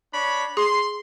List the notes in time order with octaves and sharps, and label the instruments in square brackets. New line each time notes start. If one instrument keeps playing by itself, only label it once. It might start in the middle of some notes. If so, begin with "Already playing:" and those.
[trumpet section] D4 C#5 B5
[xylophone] G#4 [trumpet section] C6